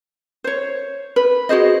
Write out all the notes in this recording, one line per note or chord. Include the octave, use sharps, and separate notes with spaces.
C5 C#5
B4
F#4 G#4 C5 D#5